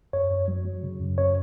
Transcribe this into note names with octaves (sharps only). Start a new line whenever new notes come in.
F#2 C#5
F#2
F#3
F#3
C#3
F#2
F#2 C#5